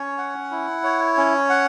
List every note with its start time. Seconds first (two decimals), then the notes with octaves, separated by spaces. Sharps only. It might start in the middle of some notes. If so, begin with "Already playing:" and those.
Already playing: C#4 C#5
0.18 F#5
0.51 E4
0.84 C#5
1.17 C#4
1.50 F#5